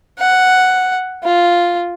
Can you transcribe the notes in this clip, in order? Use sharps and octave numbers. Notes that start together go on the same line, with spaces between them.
F#5
F4